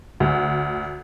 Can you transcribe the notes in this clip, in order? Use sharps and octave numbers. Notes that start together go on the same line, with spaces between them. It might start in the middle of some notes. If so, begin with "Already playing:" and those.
D2